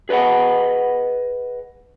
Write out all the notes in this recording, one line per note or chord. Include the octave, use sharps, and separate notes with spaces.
G#4 B4 C#5 D#5 F#5